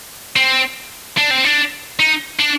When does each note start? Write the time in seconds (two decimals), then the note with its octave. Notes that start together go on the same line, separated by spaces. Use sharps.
0.36 C4
1.18 D4
1.31 C4
1.45 D4
2.00 D#4
2.39 D4